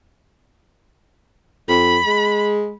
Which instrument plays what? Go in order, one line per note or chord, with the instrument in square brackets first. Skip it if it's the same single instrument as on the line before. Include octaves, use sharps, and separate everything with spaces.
[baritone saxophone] F2 [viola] B5
[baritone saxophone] G#3